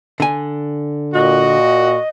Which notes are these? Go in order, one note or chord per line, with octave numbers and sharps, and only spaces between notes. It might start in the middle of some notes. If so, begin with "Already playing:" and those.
D3 G#5
A#2 F#4 D#5